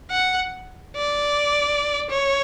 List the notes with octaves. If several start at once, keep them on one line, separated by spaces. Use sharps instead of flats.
F#5
D5
C#5